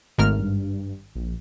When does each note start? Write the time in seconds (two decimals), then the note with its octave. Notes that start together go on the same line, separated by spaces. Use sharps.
0.18 G#1 A3 A#4 F6
0.39 G2
1.15 A#1